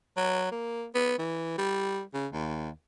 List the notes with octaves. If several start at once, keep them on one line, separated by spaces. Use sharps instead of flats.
F#3
A#3
B3
E3
G3
C#3
D#2